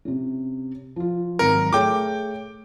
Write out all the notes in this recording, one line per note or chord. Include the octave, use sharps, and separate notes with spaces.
C3 C#4
F3 F4
G#1 F#3 A#4 C#7
A3 G#4 C#5 G5 D6